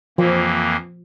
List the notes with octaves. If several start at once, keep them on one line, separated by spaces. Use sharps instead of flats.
F2 E3 F3 A#3